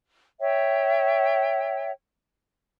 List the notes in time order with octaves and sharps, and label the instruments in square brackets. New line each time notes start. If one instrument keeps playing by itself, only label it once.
[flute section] C#5 E5 G5